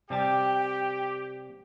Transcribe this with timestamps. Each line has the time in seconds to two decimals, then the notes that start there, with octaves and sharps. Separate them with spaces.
0.10 C3 G3 G4 G5 A5